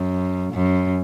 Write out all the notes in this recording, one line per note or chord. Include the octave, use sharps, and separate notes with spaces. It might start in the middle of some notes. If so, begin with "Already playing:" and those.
Already playing: F#2
F#2